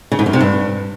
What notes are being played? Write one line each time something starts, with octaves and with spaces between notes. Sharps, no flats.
C#3
G#2
F#2
C3
G2